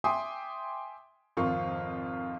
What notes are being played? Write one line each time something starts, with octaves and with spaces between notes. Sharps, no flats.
E5 G5 G#5 C6 D6 D#6
G#1 F2 F3 F4 A#4 C#6